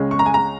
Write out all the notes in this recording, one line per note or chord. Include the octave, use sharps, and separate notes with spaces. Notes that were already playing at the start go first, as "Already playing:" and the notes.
Already playing: C#2 C#3 G#3 C#4
C#6
A#5
G#5
A#5